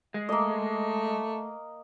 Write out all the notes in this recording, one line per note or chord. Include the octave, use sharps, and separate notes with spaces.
G#3
A3 A#3 D#5